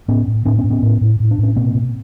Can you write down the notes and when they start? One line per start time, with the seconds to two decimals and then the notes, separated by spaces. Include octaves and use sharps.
0.08 A2 B3 C#4
0.27 A2
0.45 A2 C4 D4
0.58 B3 C#4
0.64 A2
0.70 B3 C#4
0.82 A2
1.01 A2
1.20 A2
1.31 D4
1.38 A2 C#4
1.56 B2 A#3 C4
1.75 B2